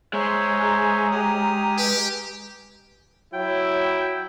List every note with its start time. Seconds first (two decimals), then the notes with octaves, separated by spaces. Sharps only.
0.13 G#3 C5 C#5 E5 A#5
1.11 G4 D#6 F6
1.78 G4 B4
3.34 F#3 E4 G5